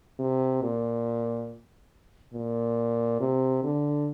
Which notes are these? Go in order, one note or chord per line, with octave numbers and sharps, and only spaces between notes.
C3
A#2
A#2
C3
D3